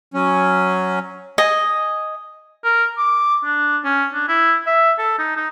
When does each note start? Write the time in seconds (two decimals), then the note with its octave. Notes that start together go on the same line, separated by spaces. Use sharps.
0.14 F#3 C#4
1.38 D#5 G#5
2.64 A#4
2.98 D6
3.44 D4
3.84 C#4
4.13 D4
4.28 E4
4.67 E5
4.98 A4
5.19 D#4
5.37 D#4